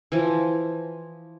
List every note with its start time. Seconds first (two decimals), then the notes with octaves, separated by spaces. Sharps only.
0.12 E3 F3